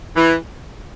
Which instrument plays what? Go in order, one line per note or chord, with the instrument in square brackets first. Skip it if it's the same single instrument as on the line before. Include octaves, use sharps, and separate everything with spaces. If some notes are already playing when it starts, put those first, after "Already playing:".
[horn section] E3